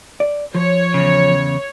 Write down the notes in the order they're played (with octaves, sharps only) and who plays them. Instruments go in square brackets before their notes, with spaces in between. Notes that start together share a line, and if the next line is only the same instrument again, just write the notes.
[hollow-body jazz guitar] D5
[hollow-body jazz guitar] F3 [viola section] C#5
[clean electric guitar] E2 C#3